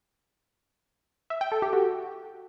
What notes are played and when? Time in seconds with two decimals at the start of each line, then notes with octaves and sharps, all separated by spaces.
1.30 E5
1.41 G5
1.52 A4
1.62 G4
1.73 F#4